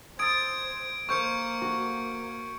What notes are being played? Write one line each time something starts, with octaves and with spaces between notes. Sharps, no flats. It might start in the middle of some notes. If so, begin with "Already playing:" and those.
C5 D#6 E6 G#6 A6 D7
A#3 C5 C#6 F6 G6 C#7
F#4